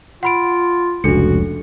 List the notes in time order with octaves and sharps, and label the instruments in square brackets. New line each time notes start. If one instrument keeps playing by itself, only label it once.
[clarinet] F4 [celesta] F#5 B5 D7
[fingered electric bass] F1 C#2 [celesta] D4 A4 C#7 [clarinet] F#4